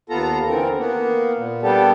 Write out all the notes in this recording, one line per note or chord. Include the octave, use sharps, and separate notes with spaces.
D#2 B3 F4 A4 A#5
D3 E3 C4 A#4
A#3 B3
A#2
G3 B3 D4 G4 A4